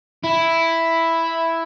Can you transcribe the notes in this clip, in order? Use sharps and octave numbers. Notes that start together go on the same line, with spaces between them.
E4